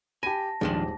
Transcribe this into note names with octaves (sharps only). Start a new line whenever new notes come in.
G4 G#5 A5 B5 A#6
D#1 G#2 D#3 F3 D4 G4 G#4